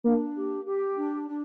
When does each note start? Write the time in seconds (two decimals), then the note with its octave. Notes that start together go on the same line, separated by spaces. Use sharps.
0.04 A#3 D4
0.36 G4
0.65 G4
0.96 D4
1.28 D4